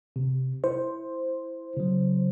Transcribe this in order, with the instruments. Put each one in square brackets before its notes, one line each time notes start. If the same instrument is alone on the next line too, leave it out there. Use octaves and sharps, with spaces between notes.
[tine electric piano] C3
[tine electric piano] E4 [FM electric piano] C5
[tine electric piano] C#3 F#3